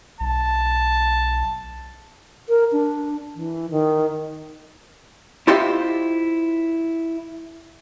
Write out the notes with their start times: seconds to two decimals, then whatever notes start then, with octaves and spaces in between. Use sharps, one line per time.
0.20 B1 A5
2.49 A#4
2.72 D4
3.35 E3
3.70 D#3
5.47 E4 F4 G4 C5 D#5 E5